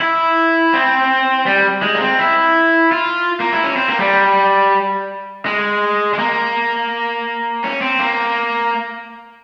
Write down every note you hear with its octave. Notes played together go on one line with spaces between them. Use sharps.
E4
C4
G3
G#3
A#3
C4
E4
F4
A#3
E4
C#4
C4
A#3
G3
G#3
G#3
A#3
C#4
C4
A#3